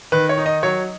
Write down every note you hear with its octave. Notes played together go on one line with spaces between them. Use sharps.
D#3 B4
C#5
D#4
D#5
F#3 C#5